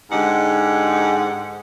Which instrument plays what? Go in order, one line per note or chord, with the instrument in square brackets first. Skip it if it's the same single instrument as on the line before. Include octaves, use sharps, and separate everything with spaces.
[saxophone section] G#2 D3 G#3 D#4 G4 F#5